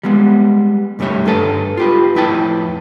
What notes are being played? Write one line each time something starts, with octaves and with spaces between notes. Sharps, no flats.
G3 G#3 B3
B1 F#2 G3 A3 C#5 E5
G2 A4 B4 A5
F4 G4 B4
F2 A2 E4 B4 G5 A5